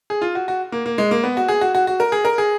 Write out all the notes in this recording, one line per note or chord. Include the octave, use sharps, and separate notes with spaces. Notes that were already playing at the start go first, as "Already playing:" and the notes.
G#4
F4
F#4
F#4
A#3
A#3
G#3
A#3
B3
F#4
G#4
F#4
F#4
F#4
A#4
G#4
A#4
G#4